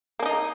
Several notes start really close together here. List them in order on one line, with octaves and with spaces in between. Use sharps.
A#3 D4 D#4